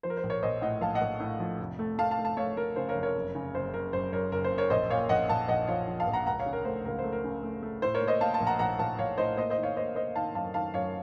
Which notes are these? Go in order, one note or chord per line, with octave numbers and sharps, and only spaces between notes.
F3 C5
A#4
C5
A#1
A#4 C#5
A#1 C5 D#5
A2 D#5 F#5
A#1 F5 A5
D#5 F#5
A#1
A2
F3
F1
A3
A3 F5 A5
F5 A5
A3
F5 A5
A3 C#5 F5
A3 A#4
C#3 C5
A#4 C#5
F1
A#4 C#5
F#1
C#3
F#1 C5
F#1 A#4
F#2 C5
F#2 A#4 C#5
F#1 A#4
C5
F#1
A#4 C#5
A#1 C5 D#5
A#2 C#5 F5
A#1 D#5 F#5
A#1 F5 A5
A#1 D#5 F#5
F3 C#5 F5
F3
F5 A5
A#1
F#5 A#5
C#2 F#5 A#5
C#5 F5
C#3
A#4
A3 C5
C#2 A#4
C5
A3
A#4
C#3
A3
A3
A2 C5
A#4 C#5
A#3
C5 D#5
A#3 F5 A5
F5 A5
A#1
F#5 A#5
A#1 F#5 A#5
A#1 F5 A5
A#1 C#5 F5
A2 C5 D#5
A#3 C5 D#5
C5 D#5
D#3
C#5 F5
A#3 C5 D#5
A#3 C5 D#5
D#3 F5 A5
F#2 F5 A5
D#3 F5 A5
F#2 C#5 F5